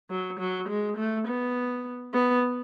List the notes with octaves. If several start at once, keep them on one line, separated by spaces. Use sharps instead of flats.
F#3
F#3
G#3
A3
B3
B3